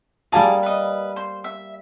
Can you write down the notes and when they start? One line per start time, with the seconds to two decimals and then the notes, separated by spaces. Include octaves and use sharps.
0.32 G3 A#3 G#4 F5 A5 A#5
0.63 B4 D#5
1.16 C5
1.44 E5